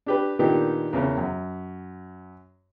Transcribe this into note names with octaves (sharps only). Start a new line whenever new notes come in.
D4 G4 B4
A#2 D#3 B3 D4 D#4 G4
E2 C#3 A#4
F#2